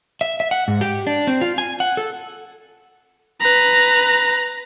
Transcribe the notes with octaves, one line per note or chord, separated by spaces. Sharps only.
E5
E5
F#5
G#2
G4
D4
C4
F4
G#5
F#5
A4
B4 A#5